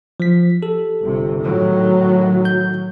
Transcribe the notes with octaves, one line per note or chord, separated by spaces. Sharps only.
F3 B6
G4 A4
G1 C3
A2 D#3 F#3
G6